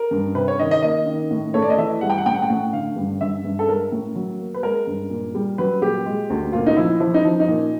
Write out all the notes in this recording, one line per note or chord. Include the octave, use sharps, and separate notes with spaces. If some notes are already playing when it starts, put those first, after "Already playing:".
Already playing: A#4
G2
C3 B4
C#5
D#3 D#5
D#5
A#3 D#5
D#3
A2
A3 C#5
D5
D#5
E3 E5
G3 F#5
G5
F#5
A2 G5
F#5
G5
A2 F#5
D3 F5
G2
G2 E5
G2
A4
G#3 A#4
A2
F#3
A#3
B4
G#3 A#4
G2
A#2
G3
F#3 B4
A#2 G4
G#3
D2
A#2 F4
D#4
F3 E4
F3 E4
D#4
F3
D#4
A#2